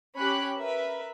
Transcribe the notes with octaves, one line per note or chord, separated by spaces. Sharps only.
C#4 G4 C#5 B5 F#6
A#4 B4 E5